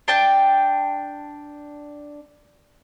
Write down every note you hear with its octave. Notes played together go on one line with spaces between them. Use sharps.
D4 G5 A5